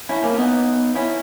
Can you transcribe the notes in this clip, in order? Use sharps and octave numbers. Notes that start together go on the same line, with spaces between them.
C#4 E4
A#3 C#4
C#4
B3 D#4
C#4 E4